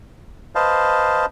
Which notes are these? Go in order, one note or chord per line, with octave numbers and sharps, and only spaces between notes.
B4 C5 D#5 F5 A5